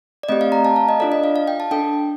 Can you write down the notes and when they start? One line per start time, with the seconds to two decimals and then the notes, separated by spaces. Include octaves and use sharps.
0.23 D5
0.29 A3 C4 G4 D#5
0.41 F5
0.52 A#5
0.65 A5
0.76 F5
0.89 D#5
1.00 D4 F4 A4 D5
1.12 D#5
1.24 F5
1.36 F5
1.48 G5
1.60 A5
1.71 D4 A4 G5